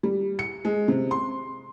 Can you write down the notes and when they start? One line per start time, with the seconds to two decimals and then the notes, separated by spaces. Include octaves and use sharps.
0.03 G3
0.39 C#7
0.65 G#3
0.88 C3
1.11 C6